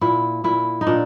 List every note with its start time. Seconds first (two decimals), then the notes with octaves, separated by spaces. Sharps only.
0.01 A#2 E4
0.44 A#2 E4
0.81 D#4
0.87 A#2 D4